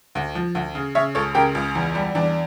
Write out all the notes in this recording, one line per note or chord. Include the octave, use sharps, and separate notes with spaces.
D2
F3
D2
C#3
C#3 C#5 E5
C#2 A4 C#5
C#3 G4 A#4
C#2
E2
G3
E2 D4